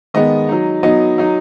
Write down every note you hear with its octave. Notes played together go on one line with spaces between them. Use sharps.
D#3 G#3 B3 D#5
F#3 D#4
F#3 B3 D#4 D#5
F#3 D#4